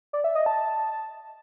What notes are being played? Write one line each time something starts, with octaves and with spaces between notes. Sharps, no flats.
D5
E5
D#5
A5